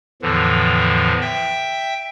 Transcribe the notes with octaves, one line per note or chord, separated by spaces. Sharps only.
E2 A2 D3 E3 F3
E5 G5